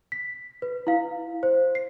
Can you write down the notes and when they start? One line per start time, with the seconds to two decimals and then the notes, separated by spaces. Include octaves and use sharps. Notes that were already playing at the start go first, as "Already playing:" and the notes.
0.12 B6
0.62 B4
0.87 E4 F5
1.43 C5
1.75 C7